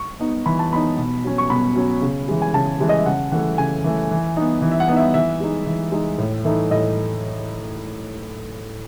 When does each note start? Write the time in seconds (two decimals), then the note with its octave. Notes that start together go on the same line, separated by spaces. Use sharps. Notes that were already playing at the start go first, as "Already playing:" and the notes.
Already playing: C#6
0.20 B3 D#4
0.46 E3 B5
0.59 A5
0.72 B3 D#4 B5
0.97 B2
1.24 F#3 C#4
1.38 C#6
1.50 B2 B5
1.76 F#3 C#4
2.02 C#3
2.28 E3 G#3
2.42 G#5
2.54 C#3 A5
2.80 E3 G#3
2.89 D#5
2.98 E5
3.06 C#3 F#5
3.32 E3 A3 F#5
3.58 C#3 G#5
3.84 E3 A3
4.11 E3
4.37 B3 D#4
4.62 E3
4.71 E5
4.80 F#5
4.88 B3 D#4
4.96 E5
5.14 E3 E5
5.40 G#3 D#4
5.66 E3
5.92 G#3 D#4
6.18 A2
6.44 E3 A3 D#4
6.71 A2 D#5